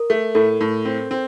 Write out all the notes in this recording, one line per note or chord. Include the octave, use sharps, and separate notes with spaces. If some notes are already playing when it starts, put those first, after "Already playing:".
Already playing: A#4
A3
A2 A4
A2
C4
C4